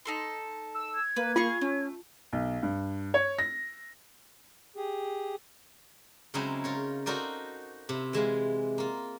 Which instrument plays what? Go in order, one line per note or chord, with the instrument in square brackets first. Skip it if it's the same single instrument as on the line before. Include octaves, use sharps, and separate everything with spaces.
[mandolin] D#4 A4 C6
[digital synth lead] E6
[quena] G#6
[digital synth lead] A#3 [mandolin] B4
[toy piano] F4 [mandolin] G#4 F5 C#6
[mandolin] A3 [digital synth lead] C#4
[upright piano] B1
G2
C#5
A#6
[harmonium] G4 G#4
[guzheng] C#3 F#3 G#3 C4 D#4 E4
F4 A#4 C#5
D#4 F#4 A4 A#4 C5 D5
C3 E4
E3 G#3 E4 F5
A#3 F4